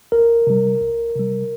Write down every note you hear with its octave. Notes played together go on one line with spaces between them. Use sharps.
C2 A#4
C3 G3
C2
C3 G3